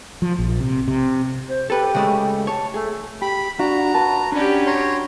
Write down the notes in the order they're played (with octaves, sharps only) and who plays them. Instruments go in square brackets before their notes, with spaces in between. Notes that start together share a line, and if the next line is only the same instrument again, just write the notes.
[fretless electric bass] F3
A#1
C3
C3
[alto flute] C5
[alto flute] G4 [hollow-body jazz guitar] A4 B4
[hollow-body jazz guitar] C#3 G#3 A3
[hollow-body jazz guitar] C#5 [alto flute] A5
[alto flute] A3 [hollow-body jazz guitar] G#4
[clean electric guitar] G4 [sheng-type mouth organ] B5
[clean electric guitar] D4 [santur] F#4 [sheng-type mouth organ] A#5
[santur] B4 [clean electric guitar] A5
[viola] C#4 G4 [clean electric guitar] D4 D5
[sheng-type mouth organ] C#5 A#5 C6